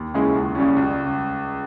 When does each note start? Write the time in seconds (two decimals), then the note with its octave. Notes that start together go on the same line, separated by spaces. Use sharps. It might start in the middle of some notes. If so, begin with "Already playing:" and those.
Already playing: D#2
0.14 C#3 G#3 C#4 E4
0.35 C#2
0.55 C#3 G3 C#4
0.77 C#2